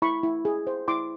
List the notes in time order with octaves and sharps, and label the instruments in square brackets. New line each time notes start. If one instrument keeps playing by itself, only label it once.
[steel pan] E4 B5 C#6
E4
G#4
C5
E4 C6 D6